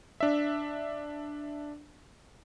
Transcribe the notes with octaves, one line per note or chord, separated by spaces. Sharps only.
D4 E5